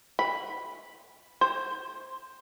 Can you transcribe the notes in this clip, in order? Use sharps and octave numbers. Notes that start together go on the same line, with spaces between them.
B5
C5